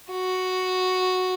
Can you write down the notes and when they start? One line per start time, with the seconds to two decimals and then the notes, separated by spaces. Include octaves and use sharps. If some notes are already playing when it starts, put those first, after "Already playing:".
0.11 F#4